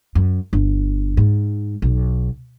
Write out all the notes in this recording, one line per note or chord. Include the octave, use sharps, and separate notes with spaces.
F#2
G1
G#2
B1